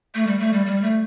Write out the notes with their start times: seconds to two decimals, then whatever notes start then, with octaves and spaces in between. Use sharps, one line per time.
0.15 A3
0.27 G3
0.39 A3
0.53 G3
0.66 G3
0.82 A3